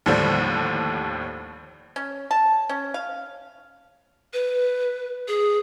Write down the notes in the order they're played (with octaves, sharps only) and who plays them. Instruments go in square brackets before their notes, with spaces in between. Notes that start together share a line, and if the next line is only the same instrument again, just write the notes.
[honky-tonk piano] D#2 A2 D3 F3 G3
[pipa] C#4
A5
C#4
F5
[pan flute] B4
G#4